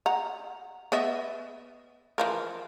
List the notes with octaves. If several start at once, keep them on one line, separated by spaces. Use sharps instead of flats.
F#5 A#5
B3 D#5 E5
E3 F3 A#4